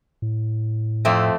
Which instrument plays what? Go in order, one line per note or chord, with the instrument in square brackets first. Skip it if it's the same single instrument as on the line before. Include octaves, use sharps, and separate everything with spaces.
[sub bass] A2
[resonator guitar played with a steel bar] F2 A3 C4